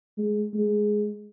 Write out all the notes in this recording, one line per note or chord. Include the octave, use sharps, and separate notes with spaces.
G#3
G#3